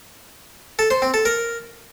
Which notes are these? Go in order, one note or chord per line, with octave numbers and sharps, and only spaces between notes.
A4
C5
C4
A4
A#4